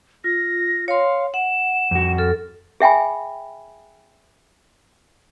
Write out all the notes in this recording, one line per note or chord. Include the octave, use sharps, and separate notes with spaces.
F4 A#6
C#5 F5 C6
F#5 E7
F2 F#4
A4 F6
G#4 E5 G5 G#5 B5